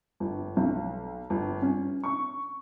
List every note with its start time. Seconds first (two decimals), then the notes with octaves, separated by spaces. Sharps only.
0.20 G1
0.57 B1
1.30 G1
1.62 C#4
2.04 C#6